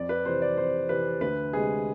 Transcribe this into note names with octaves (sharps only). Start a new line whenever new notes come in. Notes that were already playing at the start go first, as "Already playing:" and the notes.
Already playing: F2 D5
B4
C3 E3 C5
D5
F2 C5
C3 E3 B4
D2 B4
C3 G#3 G#4